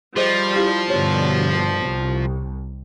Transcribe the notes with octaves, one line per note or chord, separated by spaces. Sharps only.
F3 G3 G#4 C5 D#5
E4 G4 F5
G2 B2 D3 C#5
A5
C2